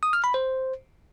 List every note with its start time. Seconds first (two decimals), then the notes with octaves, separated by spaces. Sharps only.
0.03 D#6
0.13 F6
0.24 B5
0.34 C5